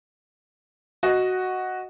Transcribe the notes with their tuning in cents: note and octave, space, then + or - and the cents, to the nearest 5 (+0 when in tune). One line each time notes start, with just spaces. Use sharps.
F#4 +0 D#5 +0